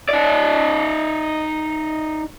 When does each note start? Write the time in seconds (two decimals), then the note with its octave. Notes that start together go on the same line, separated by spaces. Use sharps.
0.09 D#4 D5